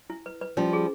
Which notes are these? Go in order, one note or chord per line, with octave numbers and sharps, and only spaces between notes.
E4
B4
B4
F3 G3 C#4
G#4